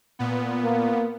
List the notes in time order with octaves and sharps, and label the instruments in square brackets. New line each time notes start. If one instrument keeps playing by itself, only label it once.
[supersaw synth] A#2 B3
[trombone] A#3